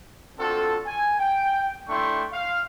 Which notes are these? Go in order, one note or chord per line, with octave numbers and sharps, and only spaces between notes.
C4 D4 F4 F#4 A4
G#5
G5
A3 D4 E4 G5 C6 C#6
F5